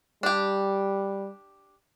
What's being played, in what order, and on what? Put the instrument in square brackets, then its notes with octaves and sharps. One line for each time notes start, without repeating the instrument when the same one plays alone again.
[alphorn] G3 [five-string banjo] D4 G4